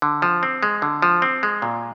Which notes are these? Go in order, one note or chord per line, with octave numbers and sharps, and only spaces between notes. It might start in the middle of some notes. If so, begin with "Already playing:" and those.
D3
F3
C4
G#3
D3
F3
C4
G#3
A#2